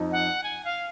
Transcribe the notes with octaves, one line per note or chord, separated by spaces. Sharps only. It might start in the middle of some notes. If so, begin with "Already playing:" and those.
Already playing: F2 D#4
F#5
G#5
F5